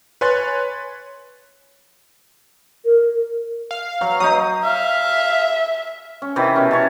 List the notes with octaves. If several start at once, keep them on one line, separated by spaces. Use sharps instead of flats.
B4 C#5 G#5 C6 F#6 A6
A#4
F5
F#3
F#3 D#4 D#6
E5 F5
C#4
C3 D#3 E3
B2 C#4
C#5 F#5 A5